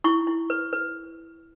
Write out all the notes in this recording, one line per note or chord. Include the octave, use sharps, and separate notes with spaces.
E4 C#6
E4
B4
B4